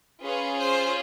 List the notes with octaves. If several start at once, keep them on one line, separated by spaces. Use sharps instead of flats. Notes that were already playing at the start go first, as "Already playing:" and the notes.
C#4 F4 G#4 B4
C5